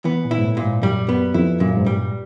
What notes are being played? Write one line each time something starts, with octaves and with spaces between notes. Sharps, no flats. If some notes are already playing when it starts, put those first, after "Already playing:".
E3 B3
A#2
E4
G#2
A2
A#2
G#2
F#2 G3
F#2 B3
F2 E4
F#2 A#2
G#2
G2 G3